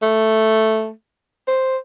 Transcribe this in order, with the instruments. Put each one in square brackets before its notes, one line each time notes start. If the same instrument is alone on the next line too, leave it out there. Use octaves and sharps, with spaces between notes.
[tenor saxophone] A3
C5